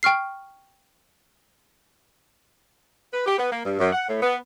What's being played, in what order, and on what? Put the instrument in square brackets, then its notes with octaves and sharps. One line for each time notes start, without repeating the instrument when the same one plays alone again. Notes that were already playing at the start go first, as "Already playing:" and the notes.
[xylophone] G5 C#6 F6 C7
[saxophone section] B4
G4
B3
A#3
G2
F#2
F#5
A2
B3